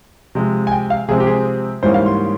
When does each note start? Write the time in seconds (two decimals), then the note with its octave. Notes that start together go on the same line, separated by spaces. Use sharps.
0.35 C3 F3 G#3
0.67 G#5
0.72 G5
0.90 F5
1.08 C3 F3 G#3 C4 G#4
1.20 G4
1.27 G#4
1.83 G#2 E3 G3 A#3 C#4 C5
1.94 F5
2.06 C6